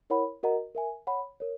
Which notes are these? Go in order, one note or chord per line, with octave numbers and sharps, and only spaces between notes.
E4 A#4 C#5 F#5 B5
F#4 A#4 D#5 F#5 A#5
A#4 E5 G#5
C#5 F#5 B5
A#4 C#5